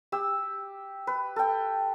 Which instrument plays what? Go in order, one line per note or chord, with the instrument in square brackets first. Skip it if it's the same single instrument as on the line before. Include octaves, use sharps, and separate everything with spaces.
[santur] G4 E6
B4
A4 G5